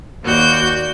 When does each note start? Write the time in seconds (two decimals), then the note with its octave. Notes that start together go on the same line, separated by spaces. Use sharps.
0.24 D#2 F#4 D5 G6